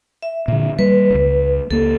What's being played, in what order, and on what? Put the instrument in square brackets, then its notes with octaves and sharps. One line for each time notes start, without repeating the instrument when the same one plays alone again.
[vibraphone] E5
[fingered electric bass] A#2 D3
[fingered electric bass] G3 G#3 A#3 [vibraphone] B4
[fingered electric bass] D#1 C#2
[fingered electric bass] C#2 A#3 [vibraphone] A4